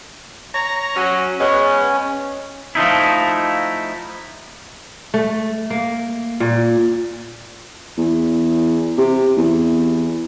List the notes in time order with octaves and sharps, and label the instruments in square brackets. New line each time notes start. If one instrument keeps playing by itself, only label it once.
[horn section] C#5 A#5
F#3 C#4
[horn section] G#3 B3 [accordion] C#4
[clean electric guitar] F3 A3 D#4 E4
[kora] A3
A#3
A#2
[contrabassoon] E2
C3
E2